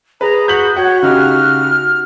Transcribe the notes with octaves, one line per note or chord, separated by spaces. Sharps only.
G#4 B4 A#5
F#4 G6 B6 F#7
F#4 C#5 F#5
C#3 D#4 G4 F6